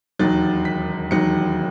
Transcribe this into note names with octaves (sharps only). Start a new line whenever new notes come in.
E1 D#2 D#3 F#3 A6
B6
E1 D#2 D#3 F#3 C#7